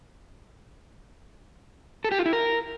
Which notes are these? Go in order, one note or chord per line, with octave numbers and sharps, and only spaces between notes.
A4
G4
F4
E4
A#4